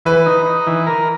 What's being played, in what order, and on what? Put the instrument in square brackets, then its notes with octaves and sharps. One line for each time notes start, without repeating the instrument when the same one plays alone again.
[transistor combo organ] E3 [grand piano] B4
[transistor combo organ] D#4
D#4
E3
A#4